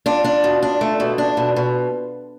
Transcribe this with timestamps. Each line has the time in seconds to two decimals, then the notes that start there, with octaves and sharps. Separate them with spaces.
0.06 D4 F4
0.24 D4
0.44 B2
0.62 D4
0.81 A3
1.00 B2
1.18 D4
1.37 B2
1.56 B2